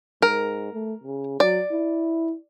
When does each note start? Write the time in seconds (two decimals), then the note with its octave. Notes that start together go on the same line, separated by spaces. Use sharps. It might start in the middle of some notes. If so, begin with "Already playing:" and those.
0.22 G#2 A#4
0.73 A3
1.04 C#3
1.40 F#3 D5
1.71 E4